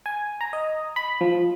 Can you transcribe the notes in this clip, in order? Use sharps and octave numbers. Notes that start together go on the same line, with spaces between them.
G#5
A#5
D#5
B5
F3